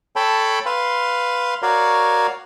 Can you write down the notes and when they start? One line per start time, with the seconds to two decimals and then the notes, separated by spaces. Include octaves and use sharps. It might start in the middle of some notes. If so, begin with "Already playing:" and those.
0.16 A4 C#5 G5 A5 B5
0.66 B4 F5 C6
1.62 F#4 A#4 C#5 D5 F5